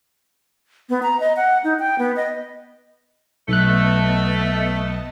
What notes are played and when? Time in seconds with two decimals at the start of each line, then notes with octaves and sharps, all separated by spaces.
0.89 B3
1.03 A#5
1.20 D#5
1.36 F#5
1.64 D#4
1.79 G5
1.99 B3
2.16 D#5
3.48 B1 A3 B3 D#5 A5 F#6